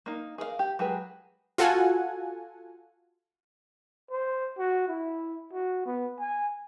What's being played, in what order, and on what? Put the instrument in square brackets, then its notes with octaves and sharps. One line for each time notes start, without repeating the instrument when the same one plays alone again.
[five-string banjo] A#3 D#4
G#4 A#4 B4 F5
G4
F#3 G#3 G4 G#4 B4
[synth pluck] F4 F#4 A4 F#5 G#5
[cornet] C5
F#4
E4
F#4
B3
G#5